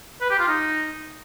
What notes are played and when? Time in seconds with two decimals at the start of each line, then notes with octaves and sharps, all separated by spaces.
0.21 B4
0.30 G4
0.39 F4
0.48 D#4